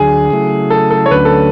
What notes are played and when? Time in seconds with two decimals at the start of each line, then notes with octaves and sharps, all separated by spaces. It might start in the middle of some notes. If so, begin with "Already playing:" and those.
Already playing: D2 D3 F#3 G#4
0.30 C#3 F#3 A3 E4
0.70 A4
0.91 A4
1.06 C#5
1.11 D2 D3 F#3 A3 C#4 B4
1.25 A4